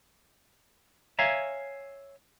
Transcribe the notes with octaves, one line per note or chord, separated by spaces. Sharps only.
C#5 E5 F5 G#5 A#5